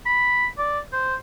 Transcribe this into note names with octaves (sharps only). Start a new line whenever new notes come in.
B5
D5
C5